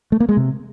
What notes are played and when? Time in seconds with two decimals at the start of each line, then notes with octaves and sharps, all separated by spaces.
0.12 A3
0.20 A#3
0.29 G#3
0.37 C3